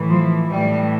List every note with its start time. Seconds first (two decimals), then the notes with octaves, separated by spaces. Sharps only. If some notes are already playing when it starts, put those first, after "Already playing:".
Already playing: A2 E3
0.09 F3
0.51 A2 E3 G3